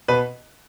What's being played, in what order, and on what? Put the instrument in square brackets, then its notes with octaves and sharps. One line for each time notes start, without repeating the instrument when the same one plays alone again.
[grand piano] B2 B4